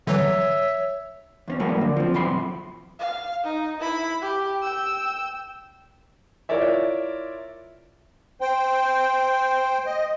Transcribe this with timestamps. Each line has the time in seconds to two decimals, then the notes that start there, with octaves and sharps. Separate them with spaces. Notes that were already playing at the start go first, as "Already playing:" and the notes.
0.07 D3 E3 F#3 C#5 E5
1.48 E2 C4 C#4
1.59 F2 A2 F#3 G3 A#3 B3
1.81 D3
1.96 F3 C4
2.14 B1 F#2 E3 B5 C6
2.99 F5
3.44 D#4
3.80 E4 B5
4.22 G4
4.62 G5 E6
6.49 E4 F4 A#4 C#5 D5 E5
8.41 C5 G5
9.86 D#5